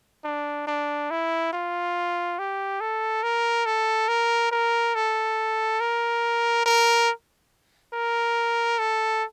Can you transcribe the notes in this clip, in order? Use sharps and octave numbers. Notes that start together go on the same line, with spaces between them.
D4
D4
E4
F4
G4
A4
A#4
A4
A#4
A#4
A4
A#4
A#4
A#4
A4